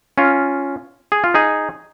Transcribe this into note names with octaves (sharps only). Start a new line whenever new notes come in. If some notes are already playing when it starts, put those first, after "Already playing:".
C#4 F4
G#4
F4
D#4 G#4